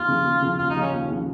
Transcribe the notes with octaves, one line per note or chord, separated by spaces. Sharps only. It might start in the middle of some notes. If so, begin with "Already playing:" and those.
Already playing: D#2 F4
C#3 F3
D#2
C#3 F3
D#2 F4
D#4
C#3 F3
C#4
D#2
C#3 F3